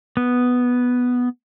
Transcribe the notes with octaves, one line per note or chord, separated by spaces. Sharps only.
B3